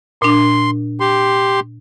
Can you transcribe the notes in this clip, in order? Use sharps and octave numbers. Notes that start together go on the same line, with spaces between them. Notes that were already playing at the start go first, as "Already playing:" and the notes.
A#2 D4 C6
G4 C6